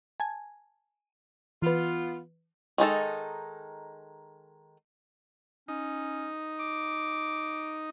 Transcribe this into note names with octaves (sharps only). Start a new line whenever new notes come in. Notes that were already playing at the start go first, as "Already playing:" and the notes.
G#5 A5 G#6
E3 B3 F4 B4
D#3 G#3 D#4 A4
C#4 D#4
D6